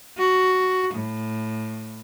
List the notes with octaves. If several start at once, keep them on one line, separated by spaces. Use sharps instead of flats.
F#4
A2